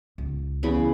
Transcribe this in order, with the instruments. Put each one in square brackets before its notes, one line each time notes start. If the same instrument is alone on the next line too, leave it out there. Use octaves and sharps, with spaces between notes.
[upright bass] C#2
[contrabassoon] E2 [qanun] C#3 B5